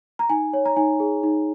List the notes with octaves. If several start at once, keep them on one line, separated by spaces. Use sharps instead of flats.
A#5
D#4 G#5
C#5
A#5
D#4 G#5
G#4
D#4